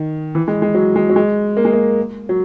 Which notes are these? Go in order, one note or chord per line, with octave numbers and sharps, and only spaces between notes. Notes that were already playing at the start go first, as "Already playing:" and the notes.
Already playing: D#3
E3
G#3
G#3
F#3
G#3
F#3
G#3
A#3
G#3
A#3
F#3